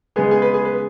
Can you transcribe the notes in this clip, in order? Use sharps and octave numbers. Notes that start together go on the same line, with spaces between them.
C#3 G#3 B3 G#4
G#4
B4
G#4
B4